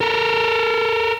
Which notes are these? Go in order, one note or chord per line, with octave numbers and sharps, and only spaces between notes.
A4 A#4